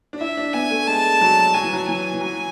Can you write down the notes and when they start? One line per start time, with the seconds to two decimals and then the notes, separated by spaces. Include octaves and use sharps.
0.13 D4
0.20 E4 E5
0.37 D4
0.53 B3 G#5
0.71 A3
0.87 G#3 A5
1.21 F#3
1.54 F#3 G#5
1.63 E3
1.73 F#3
1.87 E3 G#5
2.13 E3
2.21 F#3 G#5